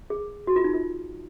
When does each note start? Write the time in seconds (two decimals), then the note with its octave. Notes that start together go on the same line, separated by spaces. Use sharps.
0.10 G#4
0.47 F#4
0.56 F4
0.64 D#4
0.74 F4